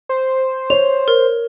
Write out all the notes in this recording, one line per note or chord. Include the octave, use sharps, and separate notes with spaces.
C5
C#5 F7
A#4